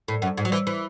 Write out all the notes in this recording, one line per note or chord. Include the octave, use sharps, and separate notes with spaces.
A2
F#2
G#2
F#3
E3
E3